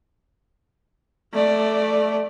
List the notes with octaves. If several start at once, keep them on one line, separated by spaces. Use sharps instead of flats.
A3 D5